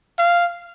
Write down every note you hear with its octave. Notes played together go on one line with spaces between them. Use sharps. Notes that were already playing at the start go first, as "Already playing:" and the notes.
F5